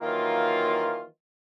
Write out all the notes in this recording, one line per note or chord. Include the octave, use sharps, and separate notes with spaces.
D#3 E3 F#3 A#3 F4